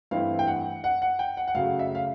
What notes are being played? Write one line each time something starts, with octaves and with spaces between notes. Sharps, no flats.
G2 E3 A3 C4 E4 F5
G5
F#5
F#5
F#5
G5
F#5
F#5
F#2 C#3 F#3 A3 C#4 F5
E5
F5